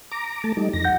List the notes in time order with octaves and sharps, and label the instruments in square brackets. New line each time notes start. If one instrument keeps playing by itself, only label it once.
[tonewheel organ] A#5 D6
A3 A5
G3 D#4
F2 A#6
[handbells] F#5 G6